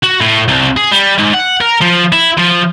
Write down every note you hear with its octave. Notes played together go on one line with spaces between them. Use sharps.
F#4
A2
C2
G#4
G3
G#2
F#5
A#4
F3
E4
F3